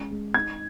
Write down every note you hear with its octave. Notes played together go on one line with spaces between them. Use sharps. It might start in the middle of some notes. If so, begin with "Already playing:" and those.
Already playing: G#3 C#4
G#3
D#4 G#6